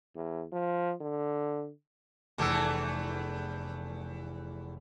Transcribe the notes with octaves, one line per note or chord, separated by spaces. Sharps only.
E2
F3
D3
F1 E2 E3 A3 E6